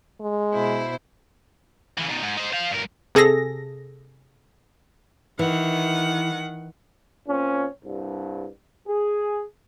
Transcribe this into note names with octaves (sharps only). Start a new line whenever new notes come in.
G#3
B2 E4 C5
C#3 E3
B2 D#3
G#2
D#4 C5
C5 F5
G2 A#4
C3 G#4 A4 A#6
D#3 E3 F#5
A#2 C4 C#4
C2 G2
G#4